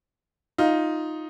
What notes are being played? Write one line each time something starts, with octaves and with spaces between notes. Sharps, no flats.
D#4 F4